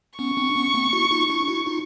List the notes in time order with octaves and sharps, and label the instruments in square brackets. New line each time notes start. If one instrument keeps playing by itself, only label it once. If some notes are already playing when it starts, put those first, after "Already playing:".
[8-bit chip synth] B3 C#4 [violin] C#6
[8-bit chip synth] C4 D4
B3 C#4
A#3 C4
E4 F#4
D#4 F4
D4 E4
E4 F#4
D#4 F4